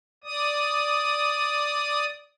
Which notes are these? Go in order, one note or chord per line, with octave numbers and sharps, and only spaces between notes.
D5 D#6